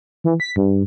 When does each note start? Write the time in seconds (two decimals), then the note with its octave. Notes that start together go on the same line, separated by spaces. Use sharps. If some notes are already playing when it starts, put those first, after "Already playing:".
0.24 E3
0.40 B6
0.56 G2